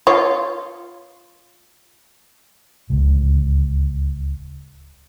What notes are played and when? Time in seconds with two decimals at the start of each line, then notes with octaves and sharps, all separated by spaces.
0.07 F4 C#5
2.90 D1 C#2